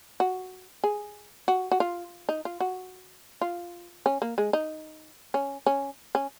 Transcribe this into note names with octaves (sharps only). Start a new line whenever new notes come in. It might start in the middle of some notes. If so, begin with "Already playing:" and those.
F#4
G#4
F#4
F#4
F4
D#4
F4
F#4
F4
C#4
A#3
G#3
D#4
C#4
C#4
C#4